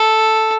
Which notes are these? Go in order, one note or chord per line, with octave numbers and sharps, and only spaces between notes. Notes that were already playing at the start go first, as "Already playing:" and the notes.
Already playing: A4